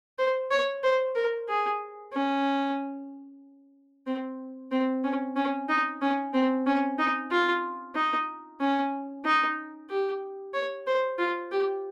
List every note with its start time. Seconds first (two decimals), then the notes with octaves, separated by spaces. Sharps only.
0.18 C5
0.51 C#5
0.83 C5
1.15 A#4
1.48 G#4
2.13 C#4
4.06 C4
4.71 C4
5.04 C#4
5.36 C#4
5.69 D#4
6.02 C#4
6.33 C4
6.66 C#4
6.98 D#4
7.30 F4
7.95 D#4
8.61 C#4
9.25 D#4
9.90 G4
10.54 C#5
10.87 C5
11.18 F4
11.52 G4